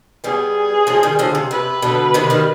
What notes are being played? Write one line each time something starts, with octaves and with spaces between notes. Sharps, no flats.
G3 B3 G#4
F3 G#3
D#3 G3
D3 F3
C3
C3 B4
B2 D3
C3 D#3
D#3 G3